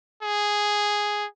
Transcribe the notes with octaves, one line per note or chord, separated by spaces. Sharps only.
G#4